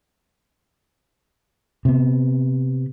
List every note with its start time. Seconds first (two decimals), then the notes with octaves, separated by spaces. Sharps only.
1.85 C3 B3